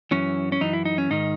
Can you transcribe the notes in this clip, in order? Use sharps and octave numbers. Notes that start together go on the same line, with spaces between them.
F#2 E3 C#4
C#4
F#2 E3 D#4
E4
D#4
C#4
G#2 D#3 D#4